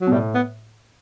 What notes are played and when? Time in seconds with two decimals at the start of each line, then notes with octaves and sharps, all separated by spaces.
0.01 F#3
0.07 B2
0.12 A2 G3
0.34 B3